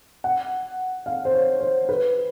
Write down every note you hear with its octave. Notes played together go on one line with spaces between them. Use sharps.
F#5
F5
C5
C#5
C5
B4